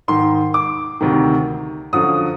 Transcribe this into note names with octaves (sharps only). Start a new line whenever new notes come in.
G#2 D#3 C6
D6
D2 C3 D#3
F#2 D3 F3 D#6